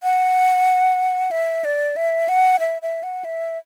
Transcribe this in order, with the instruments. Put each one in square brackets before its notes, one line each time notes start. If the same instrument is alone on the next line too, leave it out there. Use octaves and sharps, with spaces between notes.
[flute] F#5
E5
D5
E5
F#5
E5
E5
F#5
E5